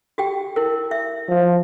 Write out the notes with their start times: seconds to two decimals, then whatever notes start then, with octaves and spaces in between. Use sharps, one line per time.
0.18 F#4 G4 G5
0.56 E4 A#4
0.91 E5
1.29 F3